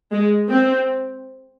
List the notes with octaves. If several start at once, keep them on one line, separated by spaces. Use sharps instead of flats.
G#3
C4